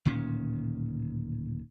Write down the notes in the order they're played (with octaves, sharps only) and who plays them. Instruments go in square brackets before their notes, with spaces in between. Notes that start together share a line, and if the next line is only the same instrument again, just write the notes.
[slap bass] D1 A#2 D#3 C#4